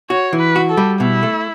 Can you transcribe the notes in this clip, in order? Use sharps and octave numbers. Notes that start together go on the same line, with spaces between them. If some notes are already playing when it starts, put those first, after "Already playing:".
F#4 C#5
E3
B4
F#4
A4
G3
B2 E4
A3